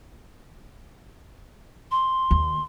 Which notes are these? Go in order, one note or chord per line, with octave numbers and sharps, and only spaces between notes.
C6
D#2